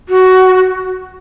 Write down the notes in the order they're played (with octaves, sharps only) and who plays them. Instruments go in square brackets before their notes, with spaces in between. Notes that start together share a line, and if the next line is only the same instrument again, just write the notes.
[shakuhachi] F#4